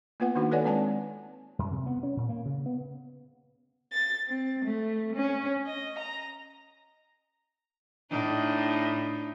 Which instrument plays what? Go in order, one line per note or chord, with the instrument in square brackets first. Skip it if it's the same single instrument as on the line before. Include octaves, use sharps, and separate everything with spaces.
[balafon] A#3 B3 F4 B4 F#5
D#3 A#3 D4 D#4 F#4
A4 B4 C#5 D5 F#5 G#5
G#3 C4 D5 G#5 A5
[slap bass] F#2
C3
B3
C#4
A#2
A#3
C#3
B3
[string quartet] A6
C4
A3
C#4
D#5
A#5
[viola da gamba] A2 D4 D#4